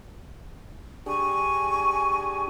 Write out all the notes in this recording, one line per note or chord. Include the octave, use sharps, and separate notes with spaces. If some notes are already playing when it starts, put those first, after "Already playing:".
D4 G4 G#4 G#5 C#6